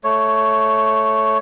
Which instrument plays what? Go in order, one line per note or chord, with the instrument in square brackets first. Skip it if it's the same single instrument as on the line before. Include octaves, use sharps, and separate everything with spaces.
[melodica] A3 C#5